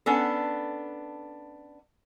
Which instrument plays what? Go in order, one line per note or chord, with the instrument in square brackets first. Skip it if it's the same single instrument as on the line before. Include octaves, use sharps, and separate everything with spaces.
[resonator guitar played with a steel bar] B3 C#4 D4 A4